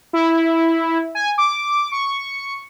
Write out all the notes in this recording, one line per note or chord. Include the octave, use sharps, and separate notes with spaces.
E4
G#5
D6
C#6